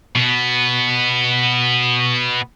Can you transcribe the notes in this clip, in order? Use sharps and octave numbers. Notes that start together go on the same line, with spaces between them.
B2 B3